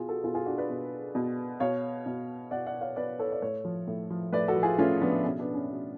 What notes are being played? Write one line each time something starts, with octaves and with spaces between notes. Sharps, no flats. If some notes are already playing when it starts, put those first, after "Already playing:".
Already playing: B2 F4 G#4
F#4 A4
B2 F4 G#4
F4 G#4
D4 F#4
B4 D5
B2
B2
B2 C#5 F5
B2
B2 D5 F#5
D5 F#5
C#5 F5
B2 B4 D5
A4 C#5
D5
A2 A4 C#5
F3
A2
F3
A2 B4 D5
F#4 A4
F3
F4 G#4
A2 C#4 F4
F3 B3 D4
B2 C#4
B3 D4
C#4
B2